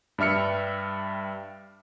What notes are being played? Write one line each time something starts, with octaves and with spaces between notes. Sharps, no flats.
G2 G3 E5 F6 C#7